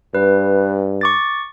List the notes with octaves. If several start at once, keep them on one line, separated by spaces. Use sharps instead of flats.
G2 B4
C#6 D6 A6